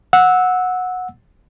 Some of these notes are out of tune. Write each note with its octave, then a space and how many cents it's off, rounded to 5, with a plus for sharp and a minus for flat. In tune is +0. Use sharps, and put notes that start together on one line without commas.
F#5 -15 E6 -15